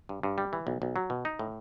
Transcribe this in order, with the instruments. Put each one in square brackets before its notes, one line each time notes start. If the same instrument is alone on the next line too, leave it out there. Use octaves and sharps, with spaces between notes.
[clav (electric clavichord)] G2
G2
G3
E3
B1
B1
F#3
B2
D#4
A2